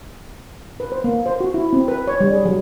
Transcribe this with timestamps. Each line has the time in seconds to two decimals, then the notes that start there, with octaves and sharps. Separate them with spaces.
0.80 B4
0.92 C5
1.04 A#3
1.26 C5
1.40 F#4
1.54 E4
1.73 C4
1.88 B4
2.07 C#5
2.20 G3
2.33 G#4
2.45 F#3